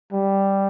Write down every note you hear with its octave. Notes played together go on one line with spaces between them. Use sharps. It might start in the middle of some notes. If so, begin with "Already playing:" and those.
G3